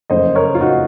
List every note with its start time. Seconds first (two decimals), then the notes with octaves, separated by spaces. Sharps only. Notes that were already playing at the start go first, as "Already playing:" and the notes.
0.10 F#1 F2 C#3 A3 C5 D#5
0.35 A#4 C#5
0.55 F4
0.61 D#4 F#4